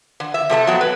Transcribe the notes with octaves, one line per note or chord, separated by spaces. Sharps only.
D3
E5
C3 A3 D5 A5
F#3 B3
B4